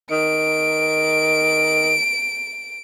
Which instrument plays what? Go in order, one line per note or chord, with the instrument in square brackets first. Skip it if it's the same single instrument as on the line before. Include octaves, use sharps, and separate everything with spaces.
[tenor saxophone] D#3 [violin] D7